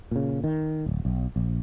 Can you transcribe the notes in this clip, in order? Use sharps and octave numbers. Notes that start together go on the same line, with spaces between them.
A#2 C#3
D#3
D1
B1
A#1